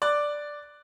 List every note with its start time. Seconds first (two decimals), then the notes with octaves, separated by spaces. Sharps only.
0.02 D5 D6 F#6